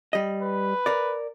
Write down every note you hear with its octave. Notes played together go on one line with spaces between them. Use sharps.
G3 D#5
B4
A#4 D5